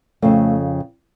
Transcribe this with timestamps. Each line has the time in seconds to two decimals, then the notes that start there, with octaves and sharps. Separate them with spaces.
0.22 F2 C#3 A3